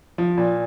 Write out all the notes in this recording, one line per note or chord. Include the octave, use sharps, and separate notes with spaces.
F3
A#2